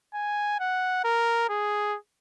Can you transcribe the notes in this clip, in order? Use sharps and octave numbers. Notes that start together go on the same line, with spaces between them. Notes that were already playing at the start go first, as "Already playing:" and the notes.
G#5
F#5
A#4
G#4